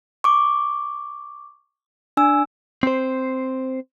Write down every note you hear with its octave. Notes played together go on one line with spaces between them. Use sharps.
C#6 D6
D4 G#5 E6
C4 C5